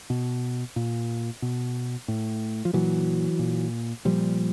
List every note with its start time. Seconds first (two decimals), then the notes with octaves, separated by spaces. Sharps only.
0.10 B2
0.76 A#2
1.42 B2
2.08 A2
2.65 F3
2.73 A#2 E3 F#3
3.39 A#2
4.05 A#2 F3 G3